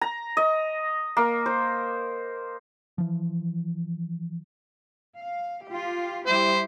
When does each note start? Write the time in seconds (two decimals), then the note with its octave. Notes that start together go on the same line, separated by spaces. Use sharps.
0.01 A#5
0.37 D#5
1.17 A#3
1.46 C5
2.98 E3 F3
5.15 F5
5.68 F4 G4
6.26 G3 E4 G4 C5